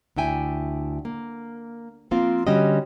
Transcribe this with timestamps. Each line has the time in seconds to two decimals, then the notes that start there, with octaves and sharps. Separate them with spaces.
0.16 D2 D4 E4 E5 G5 G#5
1.05 A#3
2.11 F3 A#3 C4 F4
2.47 D3 G3 C#4 F#4 G4 D#5